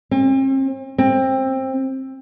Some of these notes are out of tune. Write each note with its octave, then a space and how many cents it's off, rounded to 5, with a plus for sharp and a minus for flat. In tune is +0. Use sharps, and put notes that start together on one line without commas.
C4 +45
C4 +20